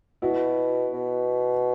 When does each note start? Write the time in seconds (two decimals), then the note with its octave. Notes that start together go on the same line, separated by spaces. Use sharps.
0.22 B2 E4 F#4
0.94 B2